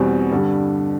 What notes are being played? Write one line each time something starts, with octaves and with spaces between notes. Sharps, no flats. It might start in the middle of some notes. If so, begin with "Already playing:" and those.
Already playing: E2 B2 G3 C4
G2 D3 G3